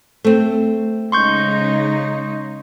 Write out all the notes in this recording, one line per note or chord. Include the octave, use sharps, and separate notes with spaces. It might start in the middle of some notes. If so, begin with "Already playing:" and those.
A3 C4
C#3 G#3 D#4 C6 C#6 G6